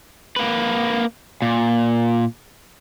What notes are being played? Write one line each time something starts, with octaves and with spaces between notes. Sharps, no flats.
A#3 B4
A#2